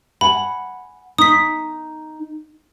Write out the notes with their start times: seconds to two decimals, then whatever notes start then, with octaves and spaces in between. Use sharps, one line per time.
0.21 F#5 G#5 B5
1.18 D#4 D#6 B6